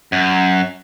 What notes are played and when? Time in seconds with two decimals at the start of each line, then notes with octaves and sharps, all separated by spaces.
0.12 F#2